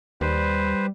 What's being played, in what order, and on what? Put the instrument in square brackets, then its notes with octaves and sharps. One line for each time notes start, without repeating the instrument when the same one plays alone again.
[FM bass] D#2 [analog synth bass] G3 [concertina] B4 C5